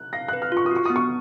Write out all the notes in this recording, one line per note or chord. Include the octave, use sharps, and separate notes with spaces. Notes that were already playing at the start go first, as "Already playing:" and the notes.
Already playing: F#6
F5 A#6
B4 F#6
F6
F4 C#6
D#6
F#4
C#6
B3 D#6
C#6